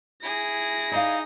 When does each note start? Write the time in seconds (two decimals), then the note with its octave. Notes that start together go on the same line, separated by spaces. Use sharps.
0.23 E4 G#4 A#6
0.92 D#4 D5 F5